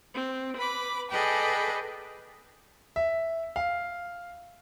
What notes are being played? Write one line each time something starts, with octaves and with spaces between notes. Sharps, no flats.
C4
B4 B5 D6
G#4 A4 B4 D5 D#5 G5
E5
F5